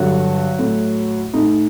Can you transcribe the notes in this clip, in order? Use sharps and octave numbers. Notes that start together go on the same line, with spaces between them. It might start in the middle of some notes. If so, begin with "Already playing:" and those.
Already playing: G2 D3 F#3 F#4
A2
A2 D#4